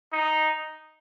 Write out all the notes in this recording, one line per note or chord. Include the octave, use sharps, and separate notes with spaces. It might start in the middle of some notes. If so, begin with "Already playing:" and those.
D#4